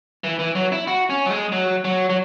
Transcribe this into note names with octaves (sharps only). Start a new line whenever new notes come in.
E3
E3
F#3
E4
F#4
C#4
F#3
G#3
F#3
F#3
F#3